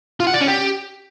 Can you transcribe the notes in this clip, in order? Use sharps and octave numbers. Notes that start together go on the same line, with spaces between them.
F4
F#5
D5
C#4
G4